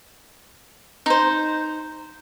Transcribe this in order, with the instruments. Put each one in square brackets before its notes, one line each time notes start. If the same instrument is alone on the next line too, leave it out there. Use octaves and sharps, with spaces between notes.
[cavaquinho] D#4 C5